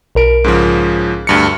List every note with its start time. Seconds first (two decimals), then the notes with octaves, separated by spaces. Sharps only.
0.15 B1 A#4 D7
0.44 G#2 C#3 F3
1.27 D2 G2 C#7